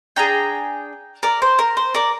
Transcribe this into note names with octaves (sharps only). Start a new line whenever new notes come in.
D4 G#4 G5 A#5
A#4 D5
C5
A#4
C5
A#4 D5